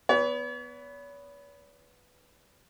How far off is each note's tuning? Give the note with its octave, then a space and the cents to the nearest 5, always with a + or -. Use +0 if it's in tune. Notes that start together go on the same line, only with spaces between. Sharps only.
B3 +0 C#5 +45